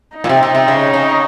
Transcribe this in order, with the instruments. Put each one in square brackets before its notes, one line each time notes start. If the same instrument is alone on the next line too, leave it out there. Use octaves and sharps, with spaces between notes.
[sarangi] D#4
[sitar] A#2
C3
C3
C3
C#3
C#3